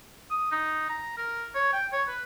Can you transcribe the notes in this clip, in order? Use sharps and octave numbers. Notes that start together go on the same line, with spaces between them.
D#6
D#4
A#5
A#4
C#5
G5
C#5
B4